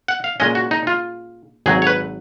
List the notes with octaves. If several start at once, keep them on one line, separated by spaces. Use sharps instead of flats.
F#5
F5
A#2 G#3 C#4 D#5
F#4
D#4
F4
G#1 G#2 F#3 G#4
C#5
B4